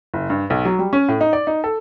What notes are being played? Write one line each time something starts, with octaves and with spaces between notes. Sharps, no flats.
F#1
G2
B1
F#3
G3
C#4
A2
D#4
D5
D#4
A4